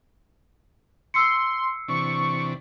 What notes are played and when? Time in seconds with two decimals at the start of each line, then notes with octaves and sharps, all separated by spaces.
1.14 C6 E6 C7 C#7
1.88 C3 E3 D4 C#6